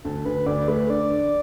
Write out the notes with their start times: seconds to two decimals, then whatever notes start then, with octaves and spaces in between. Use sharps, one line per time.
0.05 D2 A4
0.25 D2 B4
0.46 D2 D5
0.68 A3 B4
0.90 D3 D5
1.10 D4